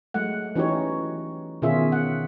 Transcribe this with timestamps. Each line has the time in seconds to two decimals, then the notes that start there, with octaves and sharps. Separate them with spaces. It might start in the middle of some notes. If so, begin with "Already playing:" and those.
0.14 F#3 G#3 A3 F#5
0.55 E3 C#4 D#4 F#4 G4 C#5
1.62 B2 D#3 C#4 F4 G#4 E5
1.92 F#5